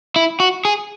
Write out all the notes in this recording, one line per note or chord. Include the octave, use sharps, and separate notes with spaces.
E4
F#4
G#4